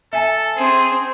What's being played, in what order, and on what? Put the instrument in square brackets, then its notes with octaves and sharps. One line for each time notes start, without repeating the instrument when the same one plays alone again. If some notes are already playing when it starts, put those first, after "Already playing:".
[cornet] A4 [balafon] E5 G#5 A5
[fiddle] C4 [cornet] G#4